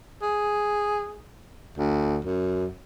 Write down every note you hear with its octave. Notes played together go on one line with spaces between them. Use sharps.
G#4
D2
F#2